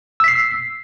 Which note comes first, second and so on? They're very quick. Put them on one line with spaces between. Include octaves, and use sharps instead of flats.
E6 B6 C7